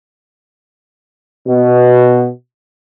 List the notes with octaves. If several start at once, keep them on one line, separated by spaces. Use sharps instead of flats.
B2